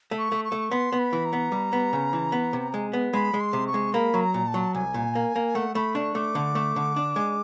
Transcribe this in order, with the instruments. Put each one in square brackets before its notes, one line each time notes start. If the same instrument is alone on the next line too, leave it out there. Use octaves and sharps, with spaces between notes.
[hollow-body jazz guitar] A3
[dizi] C#6
[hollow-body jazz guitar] A3
[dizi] C#6
[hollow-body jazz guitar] A3
[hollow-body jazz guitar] B3 [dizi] C6
[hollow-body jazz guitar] B3
[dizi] B5
[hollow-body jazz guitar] E3
[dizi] A#5
[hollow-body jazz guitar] B3
G3
B3
C#3
E3
B3
C3
G#3
B3
[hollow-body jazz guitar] G#3 [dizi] B5
[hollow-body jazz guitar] G#3
[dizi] C6
[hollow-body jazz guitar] C3
[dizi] C#6
[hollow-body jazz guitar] G#3
[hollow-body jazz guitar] A#3 [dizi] B5
[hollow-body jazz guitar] F#3
[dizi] A#5
[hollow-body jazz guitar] A#2
[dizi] A5
[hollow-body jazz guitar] F#3
[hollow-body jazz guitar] C2 [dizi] G#5
[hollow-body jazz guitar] A#2
A#3
A#3
[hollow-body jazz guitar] A3 [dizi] F#5
[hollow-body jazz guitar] A3 [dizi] B5
[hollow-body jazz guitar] D4 [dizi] C#6
[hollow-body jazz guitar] A3 [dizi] D6
[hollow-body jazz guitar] D3
A3
D3
D4
G#3